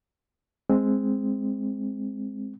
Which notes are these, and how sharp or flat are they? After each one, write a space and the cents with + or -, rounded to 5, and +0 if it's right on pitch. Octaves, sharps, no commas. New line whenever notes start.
G#3 +0 C4 +5